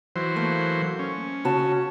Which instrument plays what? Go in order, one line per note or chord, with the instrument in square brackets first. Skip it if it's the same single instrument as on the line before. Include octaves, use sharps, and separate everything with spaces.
[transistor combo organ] E3 F#3 C5
[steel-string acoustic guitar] A3 A#3
[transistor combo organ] C#4
[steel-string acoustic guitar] C#3 F#4 A5